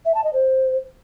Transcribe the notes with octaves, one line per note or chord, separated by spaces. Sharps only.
E5
A5
D#5
C5